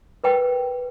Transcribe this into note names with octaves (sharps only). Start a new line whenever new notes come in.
A#4 B4 G5